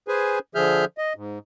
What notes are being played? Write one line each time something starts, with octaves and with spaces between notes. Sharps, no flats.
G#4 B4 C5 G#5
D3 F3 G#4 E5 F6 G6
D#5
G#2